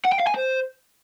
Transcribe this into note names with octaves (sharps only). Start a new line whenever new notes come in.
F#5
G5
F5
G#5
C5